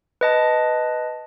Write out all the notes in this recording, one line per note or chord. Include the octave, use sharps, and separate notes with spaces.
B4 D#5 A5